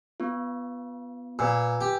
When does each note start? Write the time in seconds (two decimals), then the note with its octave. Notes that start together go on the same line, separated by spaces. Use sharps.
0.20 B3 F4
1.39 A#2 B4 G#5 E6
1.81 G4